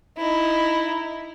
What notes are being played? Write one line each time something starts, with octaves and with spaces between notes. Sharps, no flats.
D#4 E4